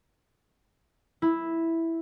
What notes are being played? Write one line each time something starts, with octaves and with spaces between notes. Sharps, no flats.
E4